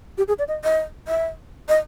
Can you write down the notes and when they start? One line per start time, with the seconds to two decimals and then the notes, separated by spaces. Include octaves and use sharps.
0.18 G4
0.28 G#4
0.39 D5
0.48 D#5
0.64 D#5
1.08 E5
1.69 D#5